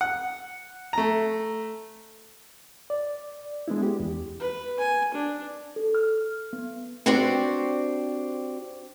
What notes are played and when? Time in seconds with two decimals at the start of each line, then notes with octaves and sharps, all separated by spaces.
0.01 F#5
0.93 A3 A#5
2.90 D5
3.68 G#3 B3 D4 E4
3.83 G4
4.00 E2
4.40 B4
4.80 G#5
5.14 D4
5.76 A4
5.95 F6
6.53 B3
7.06 C4 D4 F#4 G4 C5 D5